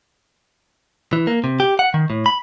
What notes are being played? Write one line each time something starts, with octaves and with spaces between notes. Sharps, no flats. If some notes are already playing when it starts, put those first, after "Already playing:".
E3
A#3
C3
G4
F#5
D#3
A2
B5